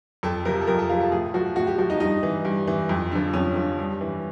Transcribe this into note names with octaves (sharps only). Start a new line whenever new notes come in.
F2 A4
C3 F3 A#4
A4
F2 A#4
A4
C3 F3 F4
A4
A2 G#4
F3 F#4
A2 F#4
G4
F3 F#4
D#4
G2 D#4
E3
G2
E3
F2
D3 F3
F2 C#4
D3 F3
G2
E3